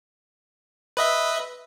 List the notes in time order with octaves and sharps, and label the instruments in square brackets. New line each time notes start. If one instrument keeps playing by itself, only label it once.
[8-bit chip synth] B4 D#5 E5